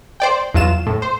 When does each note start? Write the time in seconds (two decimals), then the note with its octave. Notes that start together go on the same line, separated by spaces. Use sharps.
0.20 C5 D5 G5
0.54 E2 F#3 F4 E7
0.87 A2
1.02 C5